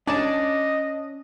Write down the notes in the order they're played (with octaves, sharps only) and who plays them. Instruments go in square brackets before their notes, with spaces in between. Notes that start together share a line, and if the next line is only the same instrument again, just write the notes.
[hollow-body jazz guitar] C#4 [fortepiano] D4 D5 A5 [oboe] D#5